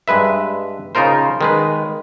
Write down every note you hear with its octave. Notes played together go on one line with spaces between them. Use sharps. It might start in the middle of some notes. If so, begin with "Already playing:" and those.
G2 G#3 B4 E5
C#3 D#4 F4 A#4 C5
D#3 G#3 B4